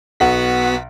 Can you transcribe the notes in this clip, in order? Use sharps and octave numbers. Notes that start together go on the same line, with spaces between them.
B1 B3 F#4 F#5 B6